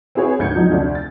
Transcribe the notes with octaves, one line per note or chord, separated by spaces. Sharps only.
C4 E4 F#4 G#4 B4 C#5
G#1 D2 G6 G#6 C#7
F3 F#3 D#4
F1 D2 D4
A6